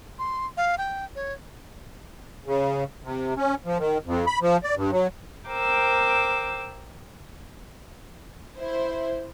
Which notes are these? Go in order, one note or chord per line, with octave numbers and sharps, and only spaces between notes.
C6
F5
G5
C#5
C#3
C3
C#4
F3
D#3
F2
B5
F3
D5
G2
F#3
A#4 C5 G5 D6 E6
E4 C5